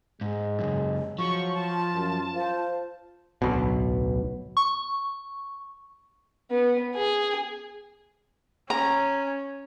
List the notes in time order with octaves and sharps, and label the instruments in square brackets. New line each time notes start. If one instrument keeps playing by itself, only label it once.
[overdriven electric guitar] G#2 [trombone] G#3
[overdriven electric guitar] C#2 F#2
[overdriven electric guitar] F3 [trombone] F#3 [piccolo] C#6
[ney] F4 [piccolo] A5
[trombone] F#2
[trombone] F4 [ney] C5
[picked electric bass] D1 B1 B2
[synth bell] C#6
[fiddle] B3
G#4
[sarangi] C#4 [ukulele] A#5